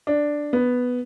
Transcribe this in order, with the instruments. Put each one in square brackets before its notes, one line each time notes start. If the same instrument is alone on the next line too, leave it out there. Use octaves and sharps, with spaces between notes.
[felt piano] D4
B3